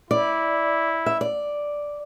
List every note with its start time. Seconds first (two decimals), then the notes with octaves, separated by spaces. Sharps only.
0.11 E4 D5
1.06 E5
1.21 D5